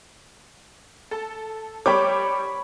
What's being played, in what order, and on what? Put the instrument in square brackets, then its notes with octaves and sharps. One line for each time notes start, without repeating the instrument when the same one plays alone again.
[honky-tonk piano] A4 A5
[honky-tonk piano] G3 G5 D6 [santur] C#5 B5